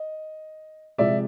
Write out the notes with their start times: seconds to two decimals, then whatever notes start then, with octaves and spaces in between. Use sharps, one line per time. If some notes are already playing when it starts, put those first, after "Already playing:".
Already playing: D#5
0.98 C3 F3 G#3 D5 E5